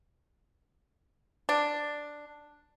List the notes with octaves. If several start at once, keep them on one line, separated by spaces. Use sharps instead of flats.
D4